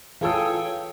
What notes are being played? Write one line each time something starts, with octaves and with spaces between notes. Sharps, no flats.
E3 F4 G#4 A4 C#5 G5 E6